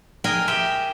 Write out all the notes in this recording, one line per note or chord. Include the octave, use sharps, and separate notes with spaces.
G#4 A#4 D#5 G5 G#5
G4 E5 G5